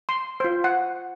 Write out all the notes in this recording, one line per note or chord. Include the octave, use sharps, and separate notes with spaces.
C6
F4 C5
F#5